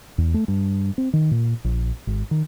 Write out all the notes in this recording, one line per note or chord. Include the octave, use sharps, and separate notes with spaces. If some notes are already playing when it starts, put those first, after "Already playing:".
E2
A3
G2
C4
D#3
A#2
A#1
G#1
D#3